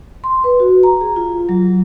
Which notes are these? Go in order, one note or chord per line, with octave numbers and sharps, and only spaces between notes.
C6
B4
F#4
A#5
G#4
F4
F#3